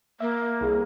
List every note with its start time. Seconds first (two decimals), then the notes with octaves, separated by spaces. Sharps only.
0.20 A#3 E5
0.61 C2 G#4